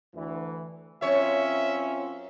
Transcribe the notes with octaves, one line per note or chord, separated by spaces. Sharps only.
D2 E3
F#2 C4 C#4 F4 C#5 E5